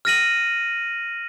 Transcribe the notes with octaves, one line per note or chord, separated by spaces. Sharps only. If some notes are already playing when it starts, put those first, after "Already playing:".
F6 A#6 D#7 F#7